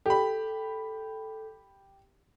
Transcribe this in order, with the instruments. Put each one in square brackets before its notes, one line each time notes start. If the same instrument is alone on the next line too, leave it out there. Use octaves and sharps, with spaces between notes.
[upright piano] G4 B5 [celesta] A4